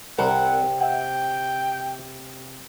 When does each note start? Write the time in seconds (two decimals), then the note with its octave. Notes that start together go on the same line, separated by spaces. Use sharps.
0.18 C2 C3 C4 A#4 F#5
0.80 E5 F#5 G5